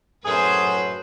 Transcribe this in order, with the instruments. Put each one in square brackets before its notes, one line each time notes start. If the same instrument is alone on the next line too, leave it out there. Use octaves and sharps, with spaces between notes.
[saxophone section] F#2 A2 F#3 [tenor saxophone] G#4 [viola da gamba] B4 C5